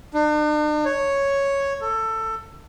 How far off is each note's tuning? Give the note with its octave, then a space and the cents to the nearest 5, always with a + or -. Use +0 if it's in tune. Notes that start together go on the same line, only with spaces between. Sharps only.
D4 +45
C#5 +0
A4 +20